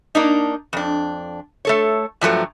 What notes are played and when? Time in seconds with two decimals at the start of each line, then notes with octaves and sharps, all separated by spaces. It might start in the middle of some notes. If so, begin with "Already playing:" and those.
0.15 A#3 D4 D#4
0.73 F2 D4
1.65 A3 A4 C#5
2.21 G2 F3 F#3 A3